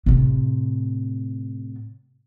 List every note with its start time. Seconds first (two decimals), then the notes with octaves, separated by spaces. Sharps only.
0.06 A2 C3